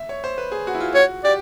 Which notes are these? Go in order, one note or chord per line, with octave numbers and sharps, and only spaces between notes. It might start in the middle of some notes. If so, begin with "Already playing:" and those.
Already playing: E5
C#5
C5
B4
G#4
F#4
E4
F4
F#4 C#5
G4 D5